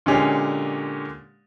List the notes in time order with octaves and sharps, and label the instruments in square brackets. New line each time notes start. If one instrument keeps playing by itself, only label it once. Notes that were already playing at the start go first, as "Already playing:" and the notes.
[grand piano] A#2 D3 G#3 C#4 G4